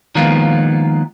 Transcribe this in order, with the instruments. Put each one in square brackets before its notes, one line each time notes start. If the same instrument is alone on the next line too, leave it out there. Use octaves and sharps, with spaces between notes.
[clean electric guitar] D#3 F3 G#3 A#3 B3 F4